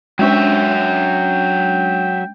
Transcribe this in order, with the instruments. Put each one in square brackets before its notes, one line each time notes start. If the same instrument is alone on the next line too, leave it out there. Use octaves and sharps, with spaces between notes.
[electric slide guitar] F#3 E5 [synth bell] G#3 C#4 D4 [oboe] G5